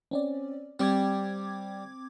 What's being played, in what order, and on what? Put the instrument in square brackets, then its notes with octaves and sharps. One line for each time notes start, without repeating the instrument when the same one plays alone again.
[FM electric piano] C4 C#4 D5
[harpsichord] G3 [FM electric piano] C4 D6 G#6